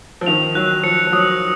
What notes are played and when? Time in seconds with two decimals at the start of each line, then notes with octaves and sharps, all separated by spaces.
0.21 F3
0.26 D#3 F7
0.55 F#3 F#6
0.83 F3 C#7
1.07 F3
1.12 F#3 D#6